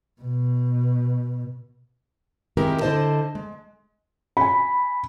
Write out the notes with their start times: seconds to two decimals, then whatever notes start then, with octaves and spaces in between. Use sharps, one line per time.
0.21 B2
2.57 D#3 G#3 C4 E4 G4 A#4
2.81 D3 E4 G4 C5 D#5 A5
3.35 G#3
4.37 G#5 B5